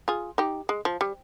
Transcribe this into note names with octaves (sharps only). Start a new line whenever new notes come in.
F4 G#4
D#4 G4
G#3
F3
G3